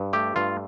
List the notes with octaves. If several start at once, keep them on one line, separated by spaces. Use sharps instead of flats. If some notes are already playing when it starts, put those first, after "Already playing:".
Already playing: G2
A3 G4
G2 F4